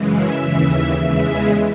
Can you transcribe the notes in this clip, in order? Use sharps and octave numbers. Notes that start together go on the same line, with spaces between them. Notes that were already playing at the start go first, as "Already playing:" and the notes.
Already playing: F#2 C#3 E3 G#3
E5
D#2 C#3 E3
E2 C#3 E3 G#3